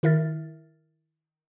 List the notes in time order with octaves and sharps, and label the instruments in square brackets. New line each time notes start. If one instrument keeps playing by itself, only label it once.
[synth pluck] D#3 E4 A#4 E5 F6 A6